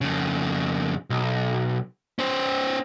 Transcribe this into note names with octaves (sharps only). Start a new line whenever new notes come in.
F2 C#3
B1
C#4 C5